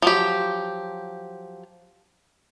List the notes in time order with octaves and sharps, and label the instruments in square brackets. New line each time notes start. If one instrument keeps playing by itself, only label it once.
[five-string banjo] F3 F#3 G4